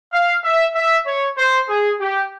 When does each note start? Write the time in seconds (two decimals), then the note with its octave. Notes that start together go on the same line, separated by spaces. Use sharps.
0.13 F5
0.44 E5
0.75 E5
1.06 C#5
1.38 C5
1.69 G#4
2.00 G4